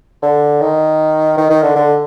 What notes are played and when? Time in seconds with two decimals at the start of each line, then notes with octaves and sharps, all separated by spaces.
0.22 D3
0.61 D#3
1.37 D#3
1.50 D#3
1.63 D3
1.75 D3